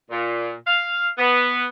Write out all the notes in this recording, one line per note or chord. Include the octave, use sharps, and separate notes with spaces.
A#2
F5
B3